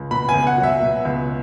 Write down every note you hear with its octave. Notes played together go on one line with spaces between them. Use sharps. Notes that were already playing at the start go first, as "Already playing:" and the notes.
Already playing: C#2
B2 B5
G#5
C#2
F#5
F#3
E5
B2
C#2